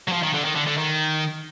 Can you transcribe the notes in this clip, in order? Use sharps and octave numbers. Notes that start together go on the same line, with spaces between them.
F#3
F3
D#3
D3
D#3
D3
D3
D#3